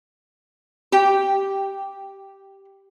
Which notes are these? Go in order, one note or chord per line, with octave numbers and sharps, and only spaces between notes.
G4 G5